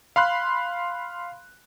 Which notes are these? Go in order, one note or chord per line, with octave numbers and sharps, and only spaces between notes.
F5 B5 C6 F#6